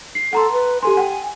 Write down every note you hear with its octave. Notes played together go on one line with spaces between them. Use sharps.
C7
A4 F#5 A#5 C6
B4
G4 A4 G#5 C6
F#5 G5